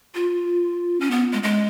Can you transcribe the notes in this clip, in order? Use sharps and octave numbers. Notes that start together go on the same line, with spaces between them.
F4
C#4
B3
G#3
G#3